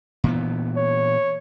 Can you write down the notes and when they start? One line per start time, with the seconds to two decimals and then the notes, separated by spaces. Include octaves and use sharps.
0.24 A#2 E3 B3
0.76 C#5